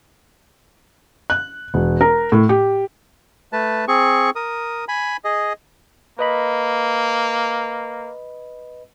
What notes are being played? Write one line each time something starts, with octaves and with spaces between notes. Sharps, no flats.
F#6
E1
A#4
A2
G4
A3 B4 A5
C4 G#4 C#6
A#4 D#6
G#5 B5
G#4 D#5
A#3 B4 D#5 B5